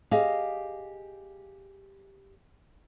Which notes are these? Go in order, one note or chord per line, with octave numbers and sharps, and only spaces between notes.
G4 G#4 D#5 F5